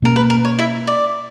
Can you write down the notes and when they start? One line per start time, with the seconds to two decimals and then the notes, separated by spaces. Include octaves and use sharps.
0.02 B2 A#3 C#4 A#4
0.16 B4
0.30 A#4
0.45 C#5
0.59 E4 E5
0.87 D5